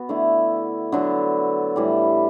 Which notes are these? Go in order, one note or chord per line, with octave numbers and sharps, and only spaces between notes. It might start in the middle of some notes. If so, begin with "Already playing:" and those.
Already playing: B3 F#4
D3 A3 E4
D3 F#3 B3
A2 E3 G3